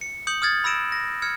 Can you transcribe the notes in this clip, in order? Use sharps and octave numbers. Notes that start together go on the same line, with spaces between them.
C#7
D#6 G6 C#7 F#7
D#6 F6 G#6 A6
B5 E6 A#6 D7 E7
A#6
F6 G#6 C#7